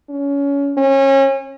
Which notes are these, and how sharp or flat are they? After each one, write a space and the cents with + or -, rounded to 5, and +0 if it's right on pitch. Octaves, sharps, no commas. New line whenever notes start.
C#4 +25
C#4 -30